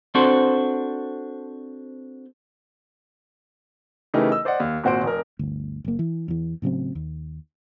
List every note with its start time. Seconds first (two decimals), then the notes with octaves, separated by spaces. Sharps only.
0.15 C4 D4 F#4 A4 C5
4.14 C#3 E3 A3 D#4 G4 A#4
4.31 D#5 E6
4.45 C5 D5 D#5 F#5
4.60 D#2
4.84 G#1 A#2 F#4 C5 D7
5.03 F1 A#4
5.39 G1 D2
5.85 F#1 A#3
5.99 E3
6.28 E2 E3
6.62 A2 C#3 F#3 C4
6.95 D#2